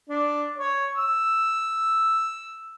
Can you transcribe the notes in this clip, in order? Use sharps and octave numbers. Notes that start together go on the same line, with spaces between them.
D4
C#5
E6